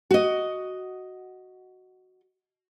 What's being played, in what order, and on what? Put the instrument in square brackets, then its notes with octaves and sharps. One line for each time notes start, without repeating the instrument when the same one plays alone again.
[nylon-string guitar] F#4 D#5